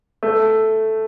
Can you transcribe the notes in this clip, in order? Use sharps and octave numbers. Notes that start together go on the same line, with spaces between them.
A3